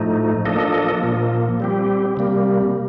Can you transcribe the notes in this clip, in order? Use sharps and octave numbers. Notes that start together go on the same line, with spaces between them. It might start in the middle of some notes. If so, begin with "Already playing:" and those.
Already playing: A2 F3 A3 D#4
F3 A#3 D4 A4 D#5
A#2 F3 A#3
G3 C4 G4
C3 G3 A#3